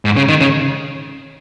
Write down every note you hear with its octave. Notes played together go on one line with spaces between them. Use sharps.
G#2
C#3
D#3
C#3